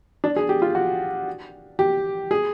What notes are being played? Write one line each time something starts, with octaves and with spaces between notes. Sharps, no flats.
D4
G#4
G4
F4
F#4
G4
G#4